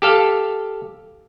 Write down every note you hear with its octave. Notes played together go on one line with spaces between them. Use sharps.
G4 A4 F5